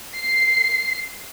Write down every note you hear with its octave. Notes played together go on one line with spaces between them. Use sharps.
C7